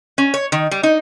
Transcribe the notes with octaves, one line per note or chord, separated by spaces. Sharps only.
C#4
C#5
D#3
G3
D#4